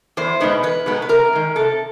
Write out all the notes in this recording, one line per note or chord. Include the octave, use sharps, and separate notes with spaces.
E2 C5
B2 G#3 B3 D#4 B4
E2 B4
B2 G#3 B3 D#4
B4
C3 A#4
D#3 G#3
C3 A4